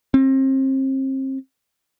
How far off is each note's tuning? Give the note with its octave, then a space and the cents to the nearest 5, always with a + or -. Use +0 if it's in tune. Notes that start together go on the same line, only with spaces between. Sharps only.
C4 +35